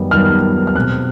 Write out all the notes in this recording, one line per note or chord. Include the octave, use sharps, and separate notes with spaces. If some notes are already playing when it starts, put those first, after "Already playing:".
Already playing: F#2 D#3 G3 B3
F#2 D#3 G3 B3 F6
F6
B2 G#3 C4 F#6